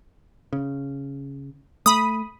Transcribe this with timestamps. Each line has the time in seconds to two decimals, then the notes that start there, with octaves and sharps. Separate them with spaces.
0.53 C#3
1.86 A3 B5 D#6